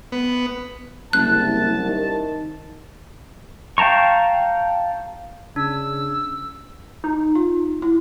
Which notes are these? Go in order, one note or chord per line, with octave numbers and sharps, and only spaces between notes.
B3
F#1 C2 A5 F#6
D#3
F5 G5 A5 A#5 C#6
C#3 D4 E6
D#4
F4
E4